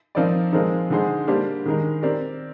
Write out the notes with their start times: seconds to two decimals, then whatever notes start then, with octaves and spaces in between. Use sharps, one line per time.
0.15 F3 C4 D#4 A#4 D5
0.52 F3 G#3 C4 D#4 A#4
0.90 D3 G#3 D#4 G#4 C5
1.27 G3 A#3 D4 G4 C5
1.65 D#3 G#3 D#4 A#4
2.02 C4 G4 A#4 D5